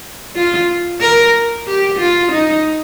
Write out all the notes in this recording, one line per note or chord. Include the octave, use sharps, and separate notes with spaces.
F4
A#4
G4
F4
D#4